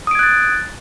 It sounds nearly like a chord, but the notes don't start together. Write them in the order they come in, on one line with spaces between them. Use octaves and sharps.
D#6 D7 G#6 F#6 A6